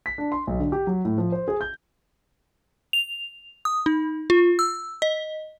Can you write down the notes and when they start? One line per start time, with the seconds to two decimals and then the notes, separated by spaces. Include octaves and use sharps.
0.06 B6
0.18 D4
0.32 C6
0.47 B1
0.60 D3
0.72 G4
0.87 F#3
1.05 A2
1.18 F3
1.32 C5
1.48 G#4
1.61 G6
2.93 F7
3.65 D#6
3.86 D#4
4.30 F4
4.59 E6
5.02 D#5